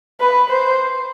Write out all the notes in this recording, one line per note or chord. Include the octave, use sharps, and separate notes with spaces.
B4
C5